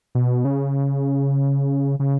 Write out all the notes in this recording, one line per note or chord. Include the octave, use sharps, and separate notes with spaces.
B2
C#3
C#3